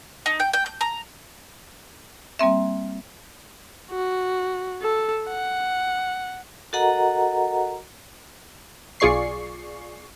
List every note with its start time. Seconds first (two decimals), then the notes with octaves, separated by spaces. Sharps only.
0.26 D#4
0.40 G5
0.54 G5
0.66 G6
0.81 A#5
2.39 G3 A#3 C4 E5
3.91 F#4
4.82 A4
5.29 F#5
6.73 F#4 A4 A#4 D#5 F#5 A#5
9.00 B1 F4 G#4 D5 C#6 C7